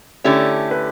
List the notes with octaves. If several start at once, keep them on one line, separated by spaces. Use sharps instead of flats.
D3 A3 C#4 E4 G4
B4